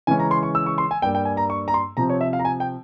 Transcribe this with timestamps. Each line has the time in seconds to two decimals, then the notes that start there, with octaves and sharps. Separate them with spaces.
0.07 C#3 E3 G#3 C#4 G#5
0.19 A#5
0.31 C6
0.43 C#6
0.55 E6
0.66 C#6
0.78 C6
0.91 G#5
1.02 G2 G3 A#3 G5
1.15 G5
1.25 G#5
1.37 A#5
1.50 C#6
1.68 A#5
1.74 C6
1.97 C3 F3 C4 A#5
2.10 C#5
2.21 E5
2.33 F5
2.39 A#5
2.45 G#5
2.60 G5